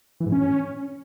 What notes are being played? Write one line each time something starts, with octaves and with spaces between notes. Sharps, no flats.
E3
G#2
C#4